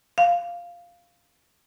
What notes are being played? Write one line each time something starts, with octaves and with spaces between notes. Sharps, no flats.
F5